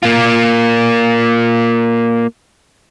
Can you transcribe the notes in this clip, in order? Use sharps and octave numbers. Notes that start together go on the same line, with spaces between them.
A#3 F4